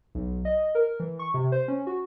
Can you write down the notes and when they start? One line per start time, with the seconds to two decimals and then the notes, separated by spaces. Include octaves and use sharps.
0.15 B1
0.45 D#5
0.75 A#4
1.00 E3
1.19 C#6
1.34 C3
1.52 C5
1.68 C#4
1.87 F#4